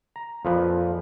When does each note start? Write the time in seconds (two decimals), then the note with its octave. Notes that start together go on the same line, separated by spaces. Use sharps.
0.16 A#5
0.45 F2 A#2 F3 B4